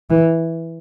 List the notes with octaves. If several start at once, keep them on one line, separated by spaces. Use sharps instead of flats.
E3